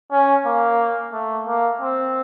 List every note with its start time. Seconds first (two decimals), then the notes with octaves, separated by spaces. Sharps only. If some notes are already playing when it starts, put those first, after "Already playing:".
0.12 C#4
0.46 A#3
1.13 A3
1.47 A#3
1.81 C4